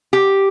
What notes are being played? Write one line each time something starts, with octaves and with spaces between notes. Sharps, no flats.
G4